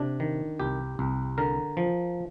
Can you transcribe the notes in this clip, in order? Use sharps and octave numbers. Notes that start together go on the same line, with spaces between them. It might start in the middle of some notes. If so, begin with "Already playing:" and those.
Already playing: C3 D4
D#3
C2 G4
C2
D3 A#4
F3